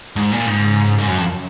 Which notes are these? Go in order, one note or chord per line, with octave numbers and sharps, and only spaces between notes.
G#2 D#3
A#2
G#2 C#3
F#2
G#2
F#2
F2